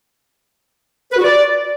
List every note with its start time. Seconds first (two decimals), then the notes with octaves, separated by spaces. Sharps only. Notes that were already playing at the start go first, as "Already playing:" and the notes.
1.12 B4
1.18 F#4
1.23 D5